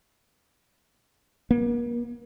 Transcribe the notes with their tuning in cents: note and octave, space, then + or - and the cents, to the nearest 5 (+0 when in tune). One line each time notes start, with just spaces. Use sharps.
A#3 +40